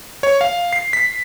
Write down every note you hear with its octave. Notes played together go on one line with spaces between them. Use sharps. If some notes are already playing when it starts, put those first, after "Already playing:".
C#5
F5
C7
B6